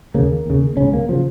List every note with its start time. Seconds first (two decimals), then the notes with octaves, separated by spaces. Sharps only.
0.14 D#2 C#3 A#3
0.46 D#2 C#3
0.77 C#2 C#3 C#4
0.93 A#3
1.09 C#3 F3